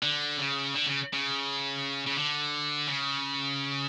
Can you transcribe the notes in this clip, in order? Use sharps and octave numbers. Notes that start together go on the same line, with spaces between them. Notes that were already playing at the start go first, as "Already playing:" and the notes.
D3
C#3
D3
C#3
C#3
C#3
D3
C#3